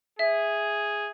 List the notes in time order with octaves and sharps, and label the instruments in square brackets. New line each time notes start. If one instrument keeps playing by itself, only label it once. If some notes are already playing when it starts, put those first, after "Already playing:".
[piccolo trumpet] G#4 [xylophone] E5